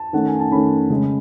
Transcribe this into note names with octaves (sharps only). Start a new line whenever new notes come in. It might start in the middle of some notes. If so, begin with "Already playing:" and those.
Already playing: A5
D#3 A3 C#4 F#5
G#5
A5
D#3 A3 C#4 B5
C#3 G#3 C#4